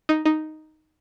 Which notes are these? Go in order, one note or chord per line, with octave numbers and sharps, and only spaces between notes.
D#4
D#4